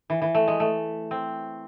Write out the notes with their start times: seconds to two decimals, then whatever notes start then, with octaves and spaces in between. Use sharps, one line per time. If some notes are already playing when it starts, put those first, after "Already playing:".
0.10 E3
0.22 E3
0.35 A3
0.48 G#3
0.60 A3
1.11 C4